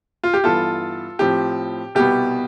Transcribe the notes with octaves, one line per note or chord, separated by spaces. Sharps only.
F4
G4
G2 E3 B3 F4 A4
A2 F3 C4 G4
C2 B2 B3 G4